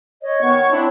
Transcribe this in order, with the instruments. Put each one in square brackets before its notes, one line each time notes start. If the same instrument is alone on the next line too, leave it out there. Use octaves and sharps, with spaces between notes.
[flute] C#5 [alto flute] D#5
[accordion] D#3 C#6 [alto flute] B3
[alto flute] F#5
[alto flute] C4 [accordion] D4 E4